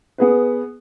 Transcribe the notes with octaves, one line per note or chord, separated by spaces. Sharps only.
B3 G#4 B4